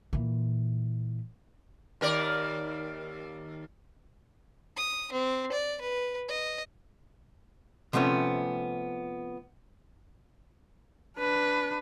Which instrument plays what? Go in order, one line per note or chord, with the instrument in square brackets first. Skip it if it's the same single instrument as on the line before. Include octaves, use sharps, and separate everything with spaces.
[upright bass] A#2 E3
[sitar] D#2 A#4 D5
[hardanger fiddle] D#6
C4
D5
B4
D#5
[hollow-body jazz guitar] C3 F3 A3 B3 C#4
[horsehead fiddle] D4 B4